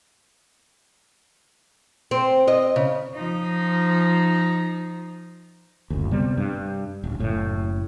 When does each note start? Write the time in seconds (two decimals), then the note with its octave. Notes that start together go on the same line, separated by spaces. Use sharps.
2.11 C4
2.48 D#5
2.76 C#3
3.14 F3 D#4
5.90 F#1 D2
6.11 C3 G3 B3
6.37 G2
7.04 D1
7.19 F#1 A2